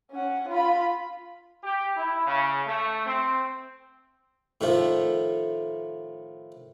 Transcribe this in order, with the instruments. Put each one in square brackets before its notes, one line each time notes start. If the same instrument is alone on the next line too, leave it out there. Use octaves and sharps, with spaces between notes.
[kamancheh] C#4 F#5
F4 B5
[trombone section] G4
E4
C#3
A3
C4
[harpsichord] A2 D#3 F3 A3